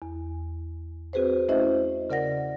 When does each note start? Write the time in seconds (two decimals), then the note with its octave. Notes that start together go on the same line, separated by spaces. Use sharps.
0.02 E2
1.13 C4 F#4 G#4 B4 C5
1.49 A3 C#4 E4 C5 D#5 E5
2.10 C#3 A#4 D5 F#5 A#6